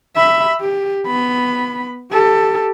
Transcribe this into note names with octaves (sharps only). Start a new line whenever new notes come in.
E5 B5
G4
B3 B5
G4 A4